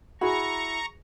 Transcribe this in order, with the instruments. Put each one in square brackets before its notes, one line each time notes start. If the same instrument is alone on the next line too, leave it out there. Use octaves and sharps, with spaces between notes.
[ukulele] E4 B5 [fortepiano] F#4 G#4 [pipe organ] A#5 C#6